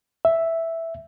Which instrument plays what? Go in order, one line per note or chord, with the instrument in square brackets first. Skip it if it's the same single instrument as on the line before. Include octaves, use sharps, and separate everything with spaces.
[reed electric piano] E5